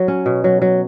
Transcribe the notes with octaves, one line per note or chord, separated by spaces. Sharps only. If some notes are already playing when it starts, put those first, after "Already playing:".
Already playing: F#3
C#4
B2
F#3
F#3